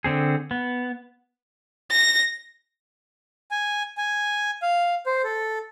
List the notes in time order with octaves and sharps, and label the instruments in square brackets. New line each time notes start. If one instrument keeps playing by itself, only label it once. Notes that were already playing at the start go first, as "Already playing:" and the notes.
[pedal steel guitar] D3 C4 G#4
B3
[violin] A#6
[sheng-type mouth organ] G#5
G#5
F5
C5
A4